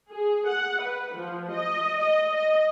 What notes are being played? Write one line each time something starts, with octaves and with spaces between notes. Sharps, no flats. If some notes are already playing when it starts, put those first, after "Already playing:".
G#4
F#5
B4
F3
D#5
D#5
D#5